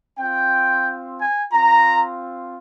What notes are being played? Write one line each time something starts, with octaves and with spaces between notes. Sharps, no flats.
C4 F4 G5
G#5
C4 F4 A#5